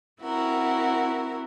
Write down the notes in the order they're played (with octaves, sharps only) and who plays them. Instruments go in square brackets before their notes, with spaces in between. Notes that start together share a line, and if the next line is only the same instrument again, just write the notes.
[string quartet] C4 E4 F#4 A#4